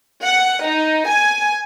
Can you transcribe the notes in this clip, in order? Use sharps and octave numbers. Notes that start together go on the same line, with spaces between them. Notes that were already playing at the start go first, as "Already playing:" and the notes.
F#5
D#4
G#5